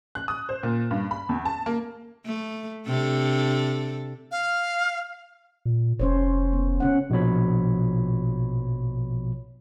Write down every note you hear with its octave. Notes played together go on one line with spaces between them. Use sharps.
F#6
D#6
C5
A#2
G2
B5
E2
A5
A#3
A3
C3 D4 A4
F5
A#2
F1 C#4 C5 C#5
B3
C#3 C#4 F#5
A#1 B2 F3 C#5 B5